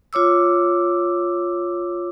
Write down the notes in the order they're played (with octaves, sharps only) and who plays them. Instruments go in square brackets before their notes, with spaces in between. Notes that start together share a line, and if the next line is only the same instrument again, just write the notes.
[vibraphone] F4 C#5 D6 E6